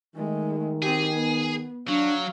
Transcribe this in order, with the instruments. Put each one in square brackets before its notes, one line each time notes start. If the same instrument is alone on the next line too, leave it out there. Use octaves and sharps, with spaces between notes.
[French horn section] D#3 [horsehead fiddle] G#3 A3
[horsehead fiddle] C4 G4 [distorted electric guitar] G#4
[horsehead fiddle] B3
[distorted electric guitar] F#3 [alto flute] D4 [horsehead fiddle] F5